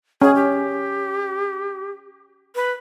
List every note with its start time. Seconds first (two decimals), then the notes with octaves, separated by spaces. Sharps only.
0.22 C#4 G#4
0.35 G4
2.55 B4